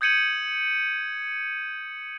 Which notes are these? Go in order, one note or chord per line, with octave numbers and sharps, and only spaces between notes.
D#6 G6 G#6 C#7 D#7 F#7